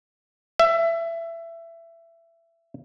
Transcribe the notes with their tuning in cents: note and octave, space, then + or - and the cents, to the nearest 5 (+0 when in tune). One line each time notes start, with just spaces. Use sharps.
E5 +20